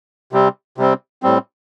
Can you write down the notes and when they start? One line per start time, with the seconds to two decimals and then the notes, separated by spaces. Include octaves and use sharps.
0.33 C3 G3 C4
0.78 C3 G3 C4
1.23 A2 G3 C4